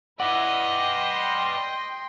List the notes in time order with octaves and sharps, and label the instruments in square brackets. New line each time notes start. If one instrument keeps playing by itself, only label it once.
[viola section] E4 [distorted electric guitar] B4 D5 [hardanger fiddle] D#5 [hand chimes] F#5
[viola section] G5 C6